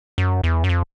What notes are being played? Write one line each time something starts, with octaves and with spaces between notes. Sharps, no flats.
F#2
E2
F#2
F2